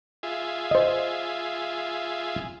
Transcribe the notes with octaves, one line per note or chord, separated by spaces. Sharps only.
F4 G#4 E5
C5 D#5